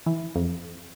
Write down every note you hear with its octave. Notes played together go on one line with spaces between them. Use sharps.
E3
F2